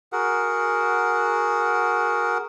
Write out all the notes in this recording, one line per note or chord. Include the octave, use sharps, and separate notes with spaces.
F#4 G#4 A#4 F#5